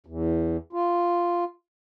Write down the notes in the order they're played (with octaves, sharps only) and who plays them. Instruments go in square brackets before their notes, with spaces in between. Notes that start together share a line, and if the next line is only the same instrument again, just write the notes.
[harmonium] E2
F4